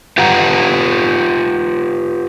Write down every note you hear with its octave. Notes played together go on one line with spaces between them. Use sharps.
F4 G4 B4 F#5 A#5